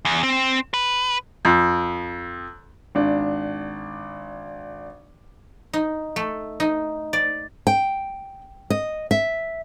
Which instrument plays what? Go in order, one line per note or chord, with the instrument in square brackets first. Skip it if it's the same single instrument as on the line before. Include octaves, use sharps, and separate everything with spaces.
[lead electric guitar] E2
C4
B4
[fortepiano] F2
[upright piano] G#1 D4
[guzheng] D#4
A3
D#4
D5
[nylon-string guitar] G5
D#5
E5